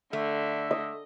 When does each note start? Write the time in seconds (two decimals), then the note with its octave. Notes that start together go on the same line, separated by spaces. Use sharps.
0.13 D3 A3 E5
0.71 D#5